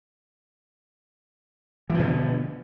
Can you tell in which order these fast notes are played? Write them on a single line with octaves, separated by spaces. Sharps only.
E3 F3 B2 D3